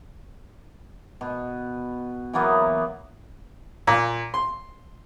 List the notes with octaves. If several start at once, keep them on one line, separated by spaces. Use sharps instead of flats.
B2
E3 F#3 A#3 B3
A#2
C6